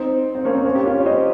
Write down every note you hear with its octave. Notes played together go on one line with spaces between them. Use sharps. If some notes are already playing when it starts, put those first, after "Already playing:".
Already playing: C4 D#4
C4
A#3 C#4
C4
A#3 C#4
G4
C#4 F4
C#5
C5 D#5